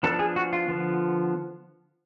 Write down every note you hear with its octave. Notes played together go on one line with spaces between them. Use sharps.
F3 B3 D4 A4
G#4
F#4
F4
D3 F3 B3